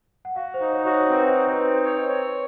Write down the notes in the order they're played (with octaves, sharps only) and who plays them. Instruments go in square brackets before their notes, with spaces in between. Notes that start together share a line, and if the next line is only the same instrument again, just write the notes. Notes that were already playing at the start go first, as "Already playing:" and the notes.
[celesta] F#5
[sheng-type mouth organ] F#4 [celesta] F5
[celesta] C5
[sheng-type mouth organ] D#4
[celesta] C#5
[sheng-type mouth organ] F#4 [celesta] C#5
[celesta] C5
[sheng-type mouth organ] C4 [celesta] B4
[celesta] C5
[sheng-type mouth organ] D#4
[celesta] B4
[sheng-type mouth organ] C4
C#5
C#5